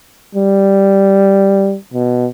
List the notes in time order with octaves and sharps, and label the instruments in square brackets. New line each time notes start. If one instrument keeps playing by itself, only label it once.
[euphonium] G3
B2